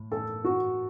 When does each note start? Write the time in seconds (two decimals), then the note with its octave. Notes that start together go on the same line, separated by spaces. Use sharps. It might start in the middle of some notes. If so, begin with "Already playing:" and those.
Already playing: A2
0.12 A4
0.45 F#4